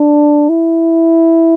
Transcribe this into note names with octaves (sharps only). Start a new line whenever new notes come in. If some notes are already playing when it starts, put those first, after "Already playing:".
Already playing: D4
E4